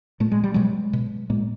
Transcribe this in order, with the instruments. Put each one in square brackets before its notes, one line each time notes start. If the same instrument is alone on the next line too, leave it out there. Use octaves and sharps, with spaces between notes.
[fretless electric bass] A#2 A3
G#3
G3
B2 F#3 G#3
B2
A#2 G#3 A#3